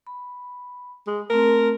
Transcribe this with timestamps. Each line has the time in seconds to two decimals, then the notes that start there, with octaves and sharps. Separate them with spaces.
0.07 B5
1.07 G#3
1.30 A3 C4 A#4